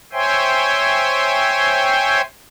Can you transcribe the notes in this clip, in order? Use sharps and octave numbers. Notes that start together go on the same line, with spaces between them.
C5 C#5 E5 G5 G#5 C6